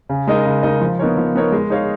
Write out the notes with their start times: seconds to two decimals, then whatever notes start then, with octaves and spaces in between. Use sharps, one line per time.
0.09 C#3
0.27 G#3 D#4 A#4 D#5
0.46 C#3
0.63 G#3 D#4 A#4 D#5
0.81 F3
0.99 B3 D#4 A#4 C#5
1.17 F3
1.35 B3 D#4 A#4 C#5
1.52 G#3
1.70 D#4 G#4 C#5 F5